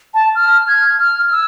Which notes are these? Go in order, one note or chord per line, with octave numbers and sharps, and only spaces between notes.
A5
F6
G#6
F6
E6